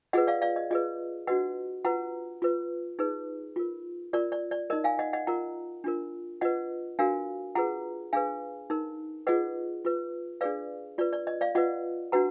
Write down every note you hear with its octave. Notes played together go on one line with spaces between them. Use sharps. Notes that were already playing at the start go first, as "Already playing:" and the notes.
F4 G#4 B4 D#5 F#5
D5 F5
D5 F5
D#5
F4 G#4 B4 D#5
D4 F#4 B4 D#5 F#5
F4 B4 F#5 A#5
F4 B4
D#4 G#4 B4
F4 A#4
F4 A#4 D5
D5
D5
D#4 A#4 D#5
F5 G#5
D#5 F#5
D#5 F#5
F4 A#4 F#5 A#5
D4 F4 A#4
F4 B4 D#5 F#5
D4 F#4 A#4 F5 G#5
F4 G#4 B4 F#5 A#5
D4 G#4 B4 F5 G#5
D#4 A#4
F4 G#4 B4 D#5 F#5
F4 B4
D4 G#4 B4 D5 F5
F4 B4 D5
D5
D#5
D5 F5
F4 B4 D#5 F#5
D4 F#4 B4 F#5 A#5